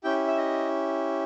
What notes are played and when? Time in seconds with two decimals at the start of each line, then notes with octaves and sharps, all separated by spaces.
0.04 C#4 E4 G4 G5
0.27 E5
0.38 D#5